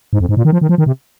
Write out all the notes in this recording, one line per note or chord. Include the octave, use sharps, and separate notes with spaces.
G#2
F2
G#2
A#2
D#3
F3
D#3
F3
D#3
C3